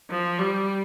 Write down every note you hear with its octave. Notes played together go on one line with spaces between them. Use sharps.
F3
G3